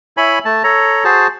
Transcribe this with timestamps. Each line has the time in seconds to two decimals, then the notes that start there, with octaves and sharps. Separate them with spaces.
0.17 E4 C#5 G#5 B5
0.45 A3 A5
0.64 A4 C#5 A#5
1.04 F#4 G#4 C5 A5